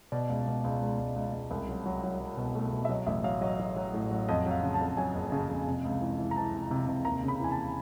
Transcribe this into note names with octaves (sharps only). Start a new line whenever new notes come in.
B2 D5
C#2
B2
C#2
C#2
C#2
C#2
C#2
C2
F#3
F#3
F#3
F#3
B2
A3
B2
E5
F#3 D#5
A1 E5
F#3 F5
F#3 D#5
F#3
F#3
A2
F#3
F2 D#5
F#3 F5
C#3
A5
F2
F#3 G#5
F#1
C#3
F2
C3
C#2
E3
E3
A#5
E3 A5
C3
C3
C3
D#2 A#5
C#3 B5
E3 G#5
A5